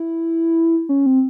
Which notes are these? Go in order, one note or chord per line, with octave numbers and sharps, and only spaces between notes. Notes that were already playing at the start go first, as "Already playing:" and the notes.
Already playing: E4
C#4
C4